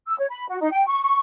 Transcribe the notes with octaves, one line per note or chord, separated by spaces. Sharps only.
E6
C#5
B5
F#4
D#4
G5
C#6
C#6